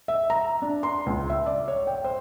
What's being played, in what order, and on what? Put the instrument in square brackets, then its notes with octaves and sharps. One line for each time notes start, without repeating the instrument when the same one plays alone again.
[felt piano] E5
A#5
D4
C6
C#2
E5
D5
C#5
G5
C5